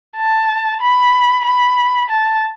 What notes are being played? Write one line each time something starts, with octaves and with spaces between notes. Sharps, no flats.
A5
B5
B5
A5